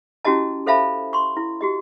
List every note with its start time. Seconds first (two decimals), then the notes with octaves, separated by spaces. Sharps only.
0.25 C#4 E4 F#4 G4 D#5 A5
0.66 A4 C5 E5 F5 A5 B5
1.13 C6 C#6
1.37 E4
1.61 F#4 G4 D#5